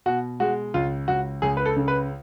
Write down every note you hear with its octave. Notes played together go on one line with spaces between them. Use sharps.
B2 F#4
G#3 F#4
C#2 F4
C#2 F#4
C#2 G#4
B4
A4
C#3
B4